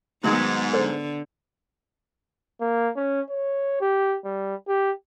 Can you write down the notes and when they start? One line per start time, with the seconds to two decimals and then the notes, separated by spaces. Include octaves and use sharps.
0.24 G#2 D#3 F#3 G#3 A3 B3 D#4
0.73 D3 A4 C5
2.60 A#3
2.96 C#4
3.29 C#5
3.81 G4
4.25 G3
4.68 G4